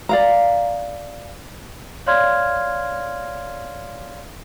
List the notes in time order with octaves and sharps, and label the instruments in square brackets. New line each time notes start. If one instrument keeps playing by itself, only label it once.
[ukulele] D5 F5 A#5
[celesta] C#5 D5 F5 C6 F6 G#6